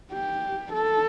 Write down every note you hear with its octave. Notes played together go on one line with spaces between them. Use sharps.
G4
A4